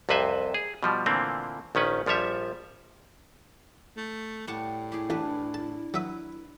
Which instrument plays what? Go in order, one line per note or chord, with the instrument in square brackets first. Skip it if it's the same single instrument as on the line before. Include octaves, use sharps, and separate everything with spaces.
[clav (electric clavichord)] C2 F2 C3 B4 C5 G#5
G#4
B2 F3 G3
A#2 D3 E3 A3 A#3 C4
A#1 D#3 C#4 B4
A#1 F3 G3 C#5 E5
[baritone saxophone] A3
[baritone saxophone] A2 [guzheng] G3 F#5 A5
[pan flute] E4 [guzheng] G4 G#4
[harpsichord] A1 [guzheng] D4 B4
[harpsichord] A5
[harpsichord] F#3 E5 D#6 [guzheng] B4